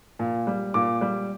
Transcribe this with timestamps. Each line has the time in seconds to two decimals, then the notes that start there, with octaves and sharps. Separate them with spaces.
0.19 A#2
0.47 G3
0.74 A#2 D6
1.01 G3